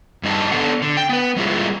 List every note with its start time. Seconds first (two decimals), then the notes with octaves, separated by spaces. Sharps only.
0.23 G2 G3 D#4 D#5 A5
0.52 B3 D4 A4 F#5
0.82 D3
0.97 G5
1.09 B3 B4
1.36 G3 G#3 A#3 E4 F4 G#4